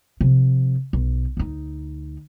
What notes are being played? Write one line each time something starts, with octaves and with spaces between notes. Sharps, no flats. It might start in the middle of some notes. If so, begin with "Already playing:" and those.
C3 F3
B1
D2 D#4